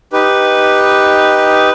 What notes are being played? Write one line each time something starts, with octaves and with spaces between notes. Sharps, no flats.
D#4 G4 B4